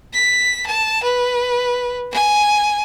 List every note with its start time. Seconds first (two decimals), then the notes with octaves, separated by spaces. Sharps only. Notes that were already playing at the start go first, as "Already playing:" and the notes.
0.14 B6
0.67 A5
1.04 B4
2.12 G#5